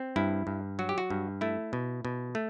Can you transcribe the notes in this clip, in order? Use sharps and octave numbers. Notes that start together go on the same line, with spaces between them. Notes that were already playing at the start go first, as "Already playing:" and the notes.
Already playing: C4
G2 E4
G2
F#3 F#4
G4
F#4
G2
A3 E4
B2
B2
A3